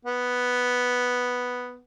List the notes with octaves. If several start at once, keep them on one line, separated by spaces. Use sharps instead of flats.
B3